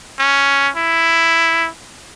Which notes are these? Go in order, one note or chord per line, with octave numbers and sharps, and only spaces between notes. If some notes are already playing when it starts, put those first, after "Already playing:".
C#4
E4